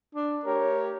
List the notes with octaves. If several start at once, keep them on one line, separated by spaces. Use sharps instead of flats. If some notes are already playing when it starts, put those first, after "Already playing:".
D4
A3 G4 A#4 C#5